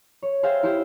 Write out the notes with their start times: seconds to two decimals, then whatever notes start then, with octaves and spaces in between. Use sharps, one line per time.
0.22 C#5
0.43 G#4 C5 E5 F5 G5
0.63 E4 G4 C5 G5